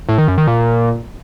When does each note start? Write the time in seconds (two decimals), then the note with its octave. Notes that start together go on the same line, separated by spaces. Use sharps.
0.09 A2
0.18 D#3
0.28 F#2
0.38 D#3
0.47 A#2